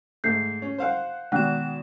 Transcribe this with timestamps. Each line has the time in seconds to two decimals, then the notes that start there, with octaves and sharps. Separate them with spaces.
0.24 G#2 A3 G6 C7
0.62 C#4
0.78 C5 F5 F#5
1.32 B2 D#3 G#3 F#5 F#6 E7